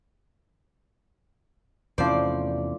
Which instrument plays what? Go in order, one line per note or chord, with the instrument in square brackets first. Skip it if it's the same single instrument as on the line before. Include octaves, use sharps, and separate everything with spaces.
[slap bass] E2 C3 C#4 [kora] A2 F3 C5 [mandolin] D5